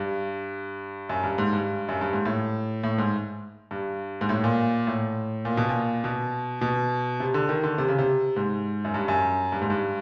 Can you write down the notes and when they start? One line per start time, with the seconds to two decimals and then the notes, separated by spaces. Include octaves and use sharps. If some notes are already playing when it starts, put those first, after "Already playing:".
Already playing: G2
1.09 F#2
1.23 G2
1.38 G#2
1.52 G2
1.89 F#2
2.01 G2
2.13 G#2
2.26 A2
2.83 A2
2.98 G#2
3.71 G2
4.21 G#2
4.29 A2
4.44 A#2
4.87 A2
5.45 A#2
5.57 B2
5.69 A#2
6.04 B2
6.61 B2
7.20 C3
7.34 D3
7.49 D#3
7.64 D3
7.78 C3
7.88 C#3
7.99 C3
8.36 G#2
8.85 F#2
8.94 G2
9.08 F#2
9.52 G2
9.61 G#2
9.70 G2